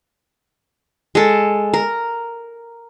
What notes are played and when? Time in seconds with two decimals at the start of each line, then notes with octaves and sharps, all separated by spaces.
1.15 G#3 A4
1.74 A#4